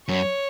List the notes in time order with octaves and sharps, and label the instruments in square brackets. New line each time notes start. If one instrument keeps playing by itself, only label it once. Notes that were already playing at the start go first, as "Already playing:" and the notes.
[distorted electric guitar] F#2 [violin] C#5